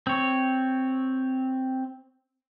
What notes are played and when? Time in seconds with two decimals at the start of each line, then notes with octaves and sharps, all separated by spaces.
0.07 C4 C#5